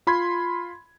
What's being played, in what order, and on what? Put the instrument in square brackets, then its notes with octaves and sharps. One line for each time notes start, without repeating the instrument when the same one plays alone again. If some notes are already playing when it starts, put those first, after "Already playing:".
[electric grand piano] F4 B5 C6 G#6